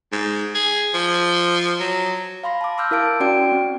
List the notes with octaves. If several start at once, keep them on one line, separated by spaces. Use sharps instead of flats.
G#2
G#4
F3
F#3
F5 B5 C6 A#6
A5 D6
C6 D6 E6 F6 G6
E4 A#4 F5 A5 D7
C#4 F#4 D5 G5 D7
C4